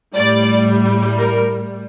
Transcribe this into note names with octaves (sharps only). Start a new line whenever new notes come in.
A2 G3 D5
A#4